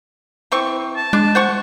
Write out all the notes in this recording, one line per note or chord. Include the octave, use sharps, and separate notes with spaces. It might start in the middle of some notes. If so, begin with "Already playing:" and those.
E3 C4 C#6
A5
G#3 D4
C5 F#5 C#6